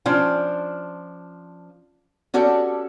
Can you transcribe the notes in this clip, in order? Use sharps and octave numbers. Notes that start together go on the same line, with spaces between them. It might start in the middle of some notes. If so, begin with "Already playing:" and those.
F3 C#4 D4 F4 G5
C#4 F#4 G4 A4 D5